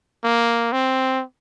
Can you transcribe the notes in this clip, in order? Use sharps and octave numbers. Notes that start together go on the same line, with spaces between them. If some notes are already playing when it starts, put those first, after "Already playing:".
A#3
C4